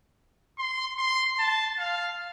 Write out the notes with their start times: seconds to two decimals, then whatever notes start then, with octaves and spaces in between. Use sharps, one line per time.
0.58 C6
0.98 C6
1.38 A5
1.79 F5